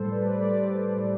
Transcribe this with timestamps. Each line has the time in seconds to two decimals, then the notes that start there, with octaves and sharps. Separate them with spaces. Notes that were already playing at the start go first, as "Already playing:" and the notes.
Already playing: A2 G3 A4 C5
0.11 B4 D5
0.40 A2 G3 B4 D5
0.97 A2 G3